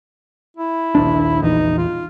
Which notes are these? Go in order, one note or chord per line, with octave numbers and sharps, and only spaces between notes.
E4
A#1 D#2 D4
A#1 E2 D#4
F4